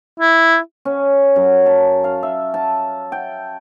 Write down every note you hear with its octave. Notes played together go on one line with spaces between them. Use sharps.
E4
C#4
F#2
A5
F5
E5
A5
G5